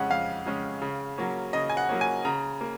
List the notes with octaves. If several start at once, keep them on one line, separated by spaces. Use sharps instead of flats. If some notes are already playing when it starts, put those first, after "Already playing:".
Already playing: F2 C#3 G#3 C#4 F#5
F2 F5
C#3 G#3 C#4
C#3
F#3 A#3 C#4
C#3 D#5
G#5
F#5
F#3 A#3 C#4
G#5
C#3 A#5
A#3